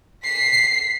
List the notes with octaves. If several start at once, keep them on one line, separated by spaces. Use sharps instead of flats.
B6 C7